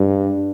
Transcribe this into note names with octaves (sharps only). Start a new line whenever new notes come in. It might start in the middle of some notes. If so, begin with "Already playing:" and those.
Already playing: G2